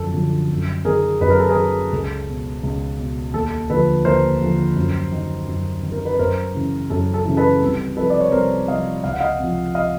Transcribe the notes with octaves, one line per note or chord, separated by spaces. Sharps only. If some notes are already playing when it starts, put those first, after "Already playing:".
Already playing: F#2 D3 F3 A4
D3 F3
F#2
D#3 G#4 A#4
F#2 B4
A#4
A4
G#4 A#4
D#3
C#2 A4
B2
C#2
B2
D#2 A4
D3 F3 A4 B4
D#2 A#4 C5
D3 F3
F#2
D#3
F#2
D#3
A#4
B4
F#2 A#4 C5
C#3 E3
F#2 A4
A4
C#3 E3
A4 B4
C2
C3 F3 A4 B4
D5
C#5
C2 A#4 C5
C3 F3 D#5 F5
C#2 F5
F#5
D#5 F5
C3 F3
D#5 F5